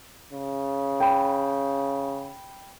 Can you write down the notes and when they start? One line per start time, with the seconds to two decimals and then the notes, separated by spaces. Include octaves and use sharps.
0.33 C#3
1.00 G5 B5